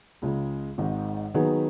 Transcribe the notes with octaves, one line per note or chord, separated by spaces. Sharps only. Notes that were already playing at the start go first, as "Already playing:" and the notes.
C#2 C#3 G#3
G#1 G#2 D#3
D#3 F#3 B3 D#4 G#4